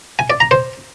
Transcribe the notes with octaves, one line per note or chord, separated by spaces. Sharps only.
G#5
D5
A#5
C5